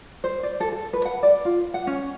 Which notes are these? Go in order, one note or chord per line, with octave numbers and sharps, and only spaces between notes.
C5
D5
A4
A4
B4
F#5
D5
F4
F#5
C#4